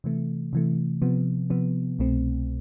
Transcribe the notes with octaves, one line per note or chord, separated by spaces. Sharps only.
C3 E3 A3
C3 E3 A3
C3 F3 B3
C3 F3 B3
C2 B2 A3 C4